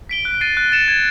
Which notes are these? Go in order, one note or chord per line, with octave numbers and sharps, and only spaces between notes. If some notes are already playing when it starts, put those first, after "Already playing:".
B6 D7 G7
F#6
A6 C7 D#7 G7
F#6
A6 C#7 E7
G#6